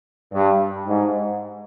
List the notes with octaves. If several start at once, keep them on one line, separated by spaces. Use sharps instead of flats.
G2
G#2